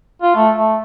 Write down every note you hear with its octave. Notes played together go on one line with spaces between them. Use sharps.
F4
A3
A3